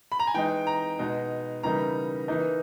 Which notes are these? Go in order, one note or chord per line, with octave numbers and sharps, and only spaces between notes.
B5
A#5
G#5
E3 G#3 D#4 G5
A#5
B2 G#3 D#4
C#3 E3 G3 A#3 D#4 A#5
E3 A#3 D#4